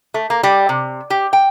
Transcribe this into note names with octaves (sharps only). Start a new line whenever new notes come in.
A3
A#3
G3
C3
G4
G5